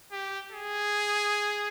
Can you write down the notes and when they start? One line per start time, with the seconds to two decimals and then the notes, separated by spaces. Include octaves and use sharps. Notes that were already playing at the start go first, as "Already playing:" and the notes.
0.12 G4
0.51 G#4